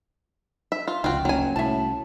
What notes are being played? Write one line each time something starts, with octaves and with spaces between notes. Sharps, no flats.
E5
F4
F1 C#2 F4 F#4 G5
F#1 F#3 G#5
C2 A2 C#4 E5 A5